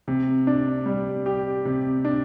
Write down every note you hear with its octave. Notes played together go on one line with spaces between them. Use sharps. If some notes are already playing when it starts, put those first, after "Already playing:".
C3
D4
G3
G4
C3
D4